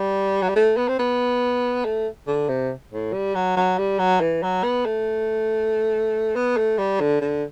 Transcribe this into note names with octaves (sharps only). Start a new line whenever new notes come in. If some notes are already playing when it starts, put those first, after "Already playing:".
Already playing: G3
F#3
G3
A3
B3
C4
B3
A3
D3
C3
A2
G3
F#3
F#3
G3
F#3
E3
F#3
B3
A3
B3
A3
G3
D3
D3